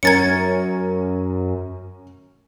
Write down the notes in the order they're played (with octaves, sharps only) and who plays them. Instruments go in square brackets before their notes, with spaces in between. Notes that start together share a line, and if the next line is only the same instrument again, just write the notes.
[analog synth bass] F#2 [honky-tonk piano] C#4 A#4 [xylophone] G#6 A6 C#7